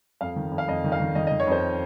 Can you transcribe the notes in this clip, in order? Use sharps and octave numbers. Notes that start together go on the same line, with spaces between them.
F2 F5
D#3
F2
F5
F2 D#5
D#3
F5
D#3
D#3 D#5
D#5
D#3
C#5
F2 C5